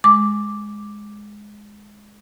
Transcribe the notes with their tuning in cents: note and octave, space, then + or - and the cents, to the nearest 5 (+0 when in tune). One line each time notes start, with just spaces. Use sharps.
G#3 +0 D6 +0